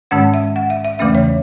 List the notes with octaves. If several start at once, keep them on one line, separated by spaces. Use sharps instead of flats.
G#2 D#3 G#3 C#4 F#5
E5
F#5
E5
E5
E2 C#3 E3 A3 C#4 E5
C#5